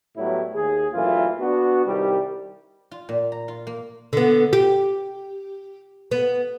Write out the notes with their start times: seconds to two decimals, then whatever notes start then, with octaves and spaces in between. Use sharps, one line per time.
0.17 A2 F#3 G3 B3 E4
0.55 D#2 G#4
0.94 F#2 A#2 E3 A3 F4
1.40 B3 D4 F#4
1.86 C2 D#3 G3
2.91 F4
3.09 A#2
3.32 A#5
3.48 F4
3.67 A#3
4.13 D3 B3
4.53 G4
6.11 B3